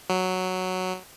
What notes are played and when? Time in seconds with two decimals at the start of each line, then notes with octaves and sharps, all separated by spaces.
0.10 F#3